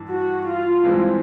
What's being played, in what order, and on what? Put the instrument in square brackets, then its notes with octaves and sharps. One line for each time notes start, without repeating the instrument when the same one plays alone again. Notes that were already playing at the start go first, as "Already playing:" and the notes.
Already playing: [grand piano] G2 E3
[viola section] F#4
F4
[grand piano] G2 E3 G#3 C4